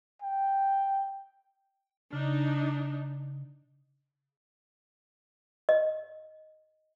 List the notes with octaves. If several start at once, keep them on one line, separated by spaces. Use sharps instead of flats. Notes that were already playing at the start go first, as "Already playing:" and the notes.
G5
C#3 D4 D#4
D#5